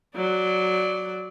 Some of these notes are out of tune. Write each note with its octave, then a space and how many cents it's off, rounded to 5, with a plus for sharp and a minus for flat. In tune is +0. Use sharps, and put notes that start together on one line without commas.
F#3 +0 D5 +0